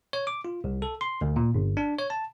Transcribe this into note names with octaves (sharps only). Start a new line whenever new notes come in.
C#5
D6
F4
C2
A4
C6
D2
A#2
G1
D4
C#5
A5